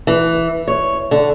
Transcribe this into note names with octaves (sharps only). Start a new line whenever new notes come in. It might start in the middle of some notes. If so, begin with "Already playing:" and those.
E3
C#5
D3